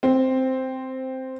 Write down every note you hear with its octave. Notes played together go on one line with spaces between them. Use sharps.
C4